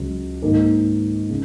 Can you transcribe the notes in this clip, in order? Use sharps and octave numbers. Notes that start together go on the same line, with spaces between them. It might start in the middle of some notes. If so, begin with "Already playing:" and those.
Already playing: C#2 C#3 F#3
G#2 D#3 A#3
C#3